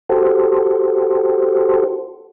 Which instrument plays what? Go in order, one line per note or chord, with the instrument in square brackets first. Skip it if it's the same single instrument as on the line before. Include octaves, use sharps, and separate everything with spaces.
[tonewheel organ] F#4 G4 A4 C5